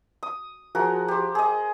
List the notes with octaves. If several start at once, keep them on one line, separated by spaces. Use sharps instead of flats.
D#6
F3 F#4 G#4 A#4
G4 C5
G#4 D#5